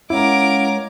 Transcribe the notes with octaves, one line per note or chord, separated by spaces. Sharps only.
G#3 C#4 E4 A#4 C#5 F5 F#5 D6